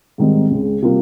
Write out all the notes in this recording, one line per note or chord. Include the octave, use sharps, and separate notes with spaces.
G#2 D#3 G3 C4 D#4
C#2 C#3 G#3
C3 G3 A#3 F4